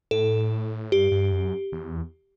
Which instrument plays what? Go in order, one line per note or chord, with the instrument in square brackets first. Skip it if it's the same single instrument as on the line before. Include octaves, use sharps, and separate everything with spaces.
[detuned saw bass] A2 [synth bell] A4
[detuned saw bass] G2 [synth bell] G4
[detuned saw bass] G2
F#2
E2